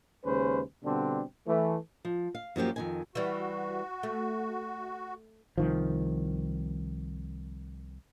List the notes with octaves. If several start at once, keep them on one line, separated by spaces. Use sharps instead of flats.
D#2 C#3 G#3 C#4 B4 C5
B2 D3 G3 C4 D4
E3 A3
F3
F5
F#2 F3 A#3 G4
F2 D#3 G#5
E3 G3 F#4
A3
C2 D#3 F3